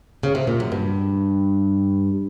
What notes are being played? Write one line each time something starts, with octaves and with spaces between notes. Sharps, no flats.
C#3
C3
A#2
F#2
G2